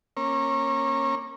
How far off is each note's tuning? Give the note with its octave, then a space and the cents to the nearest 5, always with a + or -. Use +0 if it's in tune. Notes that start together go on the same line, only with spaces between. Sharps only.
A#3 +0 C#4 -25